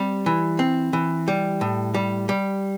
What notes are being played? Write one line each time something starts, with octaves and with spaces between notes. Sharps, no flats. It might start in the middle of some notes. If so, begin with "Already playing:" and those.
Already playing: G3 C4
E3
C4
E3
G3
A2
G3
G3